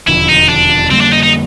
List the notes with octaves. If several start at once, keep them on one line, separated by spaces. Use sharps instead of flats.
E1 D#2 D3 F3 E4
D#4
D4
F2 D3 G3 A#3 C4
D4
D#4
D#4